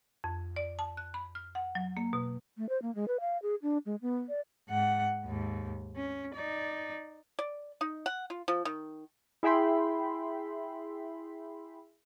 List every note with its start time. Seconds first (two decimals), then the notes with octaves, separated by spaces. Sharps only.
0.24 F2
0.56 D5
0.79 A5
0.97 F#6
1.14 B5
1.35 F6
1.55 F#5
1.75 F#3
1.97 A#3
2.13 B2
2.58 A3
2.69 C5
2.82 A#3
2.95 G#3
3.08 B4
3.20 F5
3.42 G#4
3.62 D4
3.86 G#3
4.02 B3
4.29 D5
4.69 G#2 F#5
5.25 D#2 G#2
5.96 C#4
6.34 D#4 D5
7.39 D5
7.81 D#4
8.06 F#5
8.30 F4
8.48 F3
8.65 D#3
9.43 E4 G#4 E5 G5 B5 C6